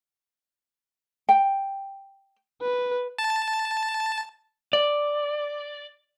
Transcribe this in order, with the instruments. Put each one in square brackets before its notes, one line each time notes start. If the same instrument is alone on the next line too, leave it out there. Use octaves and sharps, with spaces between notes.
[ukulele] G5
[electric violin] B4
[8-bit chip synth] A5
[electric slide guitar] D5